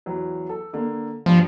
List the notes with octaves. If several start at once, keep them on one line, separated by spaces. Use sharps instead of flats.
E2 F#3
A4
D3 A#3
G2 F3